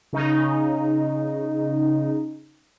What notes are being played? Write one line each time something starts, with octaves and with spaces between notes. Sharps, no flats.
C#3 D#4